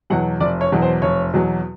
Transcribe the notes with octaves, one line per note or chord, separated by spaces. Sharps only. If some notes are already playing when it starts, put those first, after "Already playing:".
E2 B2 F#3 F#5
F1 D5
C#5
E2 B2 F#3
C5
F1 C#5
E2 B2 F#3